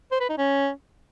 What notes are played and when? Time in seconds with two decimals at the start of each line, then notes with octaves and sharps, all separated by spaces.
0.12 C5
0.20 B4
0.29 D#4
0.38 C#4